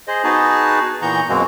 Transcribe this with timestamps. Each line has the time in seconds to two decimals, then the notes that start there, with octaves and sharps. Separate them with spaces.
0.08 G#4 C5 D#5
0.24 B3 D#4 F#4 G#4 B4 A5
1.02 A#2 E3 B3 A#5 C#6 G6
1.29 F#2 B2 G#3 A#3 C4 F#4